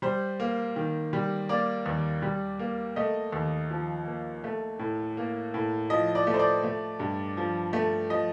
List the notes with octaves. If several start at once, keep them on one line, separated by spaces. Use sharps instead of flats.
G3 C5
A#3
D#3
G3
A#3 D5
D#2
G3
A#3
A3 D#5
D#2
F3
A#3
A3
A2
A#3
A2
F3 D#5
D5
A3
C5
D5
A3
G2
F3
A3
F3 D#5